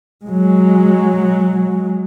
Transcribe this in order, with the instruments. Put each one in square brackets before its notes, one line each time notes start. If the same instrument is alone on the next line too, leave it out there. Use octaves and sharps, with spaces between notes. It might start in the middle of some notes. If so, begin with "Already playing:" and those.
[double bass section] F#3 G#3